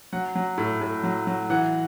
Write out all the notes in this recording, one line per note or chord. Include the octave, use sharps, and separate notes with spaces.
F#3 F#5
F#3
A2
A2
F#3
F#3
E3 F#5